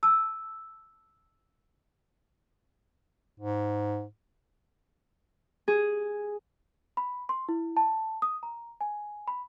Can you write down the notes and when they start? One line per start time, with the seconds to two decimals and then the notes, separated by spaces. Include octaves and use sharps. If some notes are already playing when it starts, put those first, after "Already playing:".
0.03 A5 E6
3.40 G#2
5.68 G#4
6.97 B5
7.29 C6
7.49 E4
7.77 A5
8.22 D#6
8.43 A#5
8.81 G#5
9.28 B5